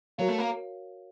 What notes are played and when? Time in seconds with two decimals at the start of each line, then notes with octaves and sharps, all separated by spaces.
0.18 F#3 F#4 A#4 C#5 F5
0.28 A3
0.38 A#3